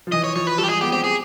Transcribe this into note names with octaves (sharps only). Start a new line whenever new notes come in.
F3
E3 D#5
C#5
F3 C#5
B4
G3 A4
G4
G#3 G#4
B3 G4
C4 G4
G#4